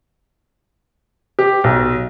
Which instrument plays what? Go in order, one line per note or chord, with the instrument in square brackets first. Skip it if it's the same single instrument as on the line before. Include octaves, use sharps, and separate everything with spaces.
[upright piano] G4
B1